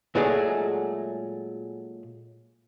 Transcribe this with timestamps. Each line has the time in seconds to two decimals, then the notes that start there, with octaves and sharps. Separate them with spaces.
0.15 A#2 F#3 G#3 A3 G#4